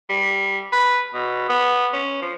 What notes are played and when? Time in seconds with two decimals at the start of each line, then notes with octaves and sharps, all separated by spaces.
0.10 G3
0.72 B4
1.14 B2
1.49 B3
1.93 C#4
2.22 F3